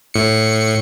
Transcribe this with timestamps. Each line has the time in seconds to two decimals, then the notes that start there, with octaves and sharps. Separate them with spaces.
0.14 A2 C#7